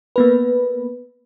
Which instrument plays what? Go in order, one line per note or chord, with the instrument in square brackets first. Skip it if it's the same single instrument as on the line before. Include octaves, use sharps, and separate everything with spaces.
[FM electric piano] A#3 B3 B4